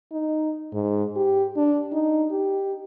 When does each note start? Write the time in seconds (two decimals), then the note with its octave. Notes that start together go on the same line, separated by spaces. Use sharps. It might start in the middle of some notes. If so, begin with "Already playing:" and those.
0.12 D#4
0.73 G#2
1.16 G4
1.57 D4
1.93 D#4
2.31 G4